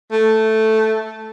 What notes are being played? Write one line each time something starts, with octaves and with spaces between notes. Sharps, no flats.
A3